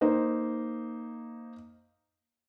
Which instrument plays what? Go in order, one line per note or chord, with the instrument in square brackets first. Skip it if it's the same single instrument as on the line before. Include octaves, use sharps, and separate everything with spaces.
[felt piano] A#3 D#4 C5